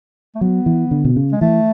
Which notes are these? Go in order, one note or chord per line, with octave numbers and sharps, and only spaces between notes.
A3
F#3 B3
E3
D3
B2
C#3
G#3
E3 A3